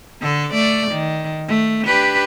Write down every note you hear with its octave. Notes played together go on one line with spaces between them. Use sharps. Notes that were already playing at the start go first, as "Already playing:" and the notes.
D3 A4
A3 D5
D#3
A3
D4 G4 B4